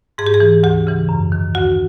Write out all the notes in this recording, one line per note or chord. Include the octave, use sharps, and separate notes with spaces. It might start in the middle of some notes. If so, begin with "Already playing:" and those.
G#2 G#4
G4
G#4
E3
D2 G4
C#3 E3
F#2
D#3
D2 F#4